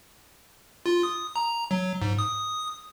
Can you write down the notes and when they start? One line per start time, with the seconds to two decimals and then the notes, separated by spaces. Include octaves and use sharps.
0.86 F4
1.03 D#6
1.36 A#5
1.71 F#3
2.02 G#2
2.19 D#6